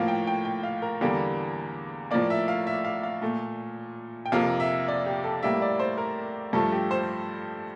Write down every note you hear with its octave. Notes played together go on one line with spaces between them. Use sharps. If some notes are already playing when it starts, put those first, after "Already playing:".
Already playing: A2 F3 A#3 F5
G5
G5
G5
F5
A#4
E2 D3 G3 A#3
A2 F3 A#3 D5
E5
F5
E5
F5
F5
A#2 A3
G5
F2 C3 F3 A#3 F5
E5
D5
G4
A4
A2 G3 A#3 E5
D5
C5
A#4
G2 F3 A3 A4
G4
C5